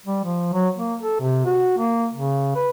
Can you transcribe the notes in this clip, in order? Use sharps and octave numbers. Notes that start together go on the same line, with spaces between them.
G3
F3
F#3
A#3
A4
C3
F#4
A#3
C#3
B4